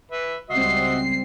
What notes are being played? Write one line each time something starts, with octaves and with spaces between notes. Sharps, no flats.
B4 E5
C#2 G3 C4 F#4 D#5 E5 C7